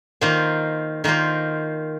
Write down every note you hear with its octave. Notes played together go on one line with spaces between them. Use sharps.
D#3 A#3 F4 C5
D#3 A#3 F4 C5